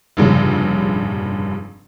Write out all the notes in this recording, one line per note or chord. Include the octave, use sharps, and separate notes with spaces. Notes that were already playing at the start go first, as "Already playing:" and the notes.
F1 A#1 G2 C#3